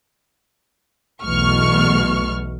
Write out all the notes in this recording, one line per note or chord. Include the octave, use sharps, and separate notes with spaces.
B1 E2 B2 A3 C#6 F6